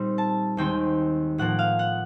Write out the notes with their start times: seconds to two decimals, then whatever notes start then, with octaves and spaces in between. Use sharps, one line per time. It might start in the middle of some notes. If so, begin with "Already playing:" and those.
Already playing: A#2 G3 C4 D#4
0.18 A5
0.57 D#2 D#3 G#3 C4 D#4 G5
1.38 A2 F3 A#3 F#5
1.59 F5
1.79 F#5